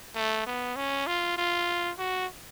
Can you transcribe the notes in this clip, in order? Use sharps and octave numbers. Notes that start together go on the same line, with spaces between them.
A3
B3
C#4
F4
F4
F#4